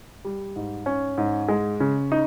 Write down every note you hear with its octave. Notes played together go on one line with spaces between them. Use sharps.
G3
G#2
C#4
G#2
G#3
C#3
D#4